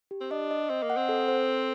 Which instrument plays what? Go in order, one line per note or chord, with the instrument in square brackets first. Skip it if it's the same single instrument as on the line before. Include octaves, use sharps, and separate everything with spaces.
[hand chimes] G4
[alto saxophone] C4
[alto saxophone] D4 [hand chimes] D#5
[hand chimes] D#5
[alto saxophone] C4 [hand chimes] D#5
[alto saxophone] A#3
[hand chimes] F#5
[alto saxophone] C4
[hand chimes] A4
C5
A4